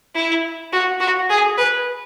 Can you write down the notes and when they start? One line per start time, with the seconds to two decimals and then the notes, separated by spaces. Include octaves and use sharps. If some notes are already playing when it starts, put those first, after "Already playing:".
0.15 E4
0.72 F#4
1.00 F#4
1.30 G#4
1.58 B4